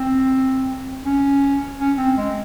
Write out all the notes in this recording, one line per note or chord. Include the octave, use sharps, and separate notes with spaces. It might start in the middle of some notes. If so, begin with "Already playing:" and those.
Already playing: C4
C#4
C#4
C4
G#3